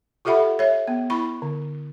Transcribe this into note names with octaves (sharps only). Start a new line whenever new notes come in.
F4 G4 A4 E5 F#5 B5
C#5 E5
B3
E4 B5 C#6
D3